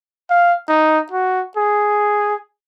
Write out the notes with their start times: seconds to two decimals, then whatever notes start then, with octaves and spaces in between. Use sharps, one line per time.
0.30 F5
0.69 D#4
1.12 F#4
1.57 G#4